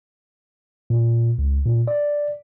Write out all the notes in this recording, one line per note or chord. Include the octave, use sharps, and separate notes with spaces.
A#2
C#2
A#2
D5